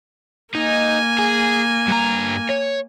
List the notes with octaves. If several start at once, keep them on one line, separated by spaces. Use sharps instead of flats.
A#3 D#4 G#5
G#4
G2 A#5
C#5